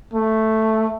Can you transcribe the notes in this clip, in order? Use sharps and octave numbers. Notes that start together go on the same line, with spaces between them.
A3